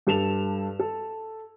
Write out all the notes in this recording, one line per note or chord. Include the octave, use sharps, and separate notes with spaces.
G2 A4 E7 F7
A4